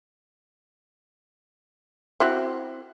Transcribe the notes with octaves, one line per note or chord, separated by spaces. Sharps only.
C4 E4 F#4